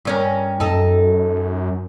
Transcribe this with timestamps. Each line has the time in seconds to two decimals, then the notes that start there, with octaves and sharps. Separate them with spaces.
0.05 G2 C#4 A#4
0.60 F#2 D#4 A4